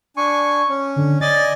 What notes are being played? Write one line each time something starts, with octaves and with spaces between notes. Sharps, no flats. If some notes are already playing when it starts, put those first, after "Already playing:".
D4 G#5 C#6
C#4
D3
D5 D#5 G#5 A6